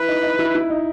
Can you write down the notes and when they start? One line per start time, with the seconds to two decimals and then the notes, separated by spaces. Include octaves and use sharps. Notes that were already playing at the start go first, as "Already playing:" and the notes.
Already playing: E4 B4
0.08 D#4
0.23 D#4
0.39 E4
0.55 E4
0.70 D#4